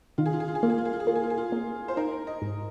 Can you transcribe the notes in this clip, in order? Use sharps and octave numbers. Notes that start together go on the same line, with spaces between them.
D#3 F4
G#4
F4
G#4
F4
G#4
A#3 F4
G#4
F4
G#4
F4
G#4
A#3 F4
G#4
F4
G#4
F4
A#3
C5
D#4 A#4
D#5
G#2